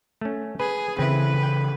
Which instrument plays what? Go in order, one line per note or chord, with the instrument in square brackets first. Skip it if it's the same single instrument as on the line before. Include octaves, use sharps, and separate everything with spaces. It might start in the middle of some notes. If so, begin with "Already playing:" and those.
[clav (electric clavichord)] A3 C#4
[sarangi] G#4 [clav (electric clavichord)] B4
[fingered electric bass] C#3 E3 [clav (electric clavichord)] C4 E4 [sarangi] B4
[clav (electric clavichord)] G5